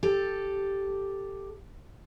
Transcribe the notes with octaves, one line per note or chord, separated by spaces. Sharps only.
G4 A4